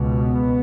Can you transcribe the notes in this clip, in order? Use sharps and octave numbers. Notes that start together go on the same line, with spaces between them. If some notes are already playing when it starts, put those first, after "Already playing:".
Already playing: C#2 B2
B3